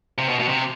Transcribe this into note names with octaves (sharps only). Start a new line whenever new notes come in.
C3
B2
B2
C3